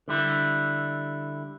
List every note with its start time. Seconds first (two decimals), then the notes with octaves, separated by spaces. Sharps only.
0.08 D3 G3 E4